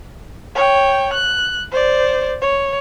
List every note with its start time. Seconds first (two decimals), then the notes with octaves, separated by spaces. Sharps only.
0.55 C#5 G5
1.14 F#6
1.71 C5 D5
2.42 C#5